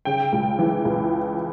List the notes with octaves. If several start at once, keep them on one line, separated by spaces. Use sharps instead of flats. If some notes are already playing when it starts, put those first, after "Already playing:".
C#3 G5
C#2
E3
C#2